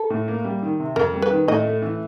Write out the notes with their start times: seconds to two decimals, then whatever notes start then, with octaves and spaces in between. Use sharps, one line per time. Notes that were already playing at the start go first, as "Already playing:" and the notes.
Already playing: A4
0.10 A2
0.28 A#3
0.44 G3
0.62 D#3
0.80 C3
0.96 F2 A#4
1.13 G3
1.22 B4
1.30 D#3
1.48 A2 D#5
1.65 A3
1.82 E3